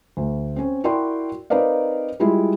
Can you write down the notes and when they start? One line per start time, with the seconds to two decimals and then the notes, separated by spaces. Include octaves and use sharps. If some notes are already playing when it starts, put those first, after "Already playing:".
0.17 D2
0.56 C4 C#4
0.84 E4 F#4 A#4 D5 G5 C6
1.50 C4 D#4 A#4 B4 D5 F5
2.20 G3 G#3 E4 F4